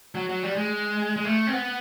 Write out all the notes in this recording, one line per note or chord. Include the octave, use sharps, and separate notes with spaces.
F#3
F#3
G3
G#3
G#3
A3
C4
B3